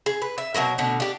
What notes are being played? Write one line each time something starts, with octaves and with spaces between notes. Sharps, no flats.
G#4
B4
E5
B2 F3 F#3 A#4
B2 D3 A3
D4 G4